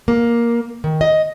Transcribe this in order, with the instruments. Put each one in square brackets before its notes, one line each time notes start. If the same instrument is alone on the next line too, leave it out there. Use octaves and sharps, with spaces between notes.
[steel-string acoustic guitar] A#3
D#3
D#5